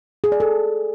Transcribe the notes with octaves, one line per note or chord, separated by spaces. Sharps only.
G#4
D5
A4